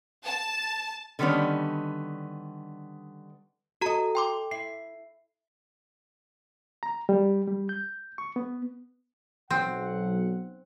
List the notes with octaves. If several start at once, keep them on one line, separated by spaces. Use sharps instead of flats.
A5
D3 D#3 G3 B3 C#4
F#4 A4 D#5 A#5
G5 C6 D6
E4 C7
A#5
G3
G3
G6
C#6
B3
B1 C4 F#5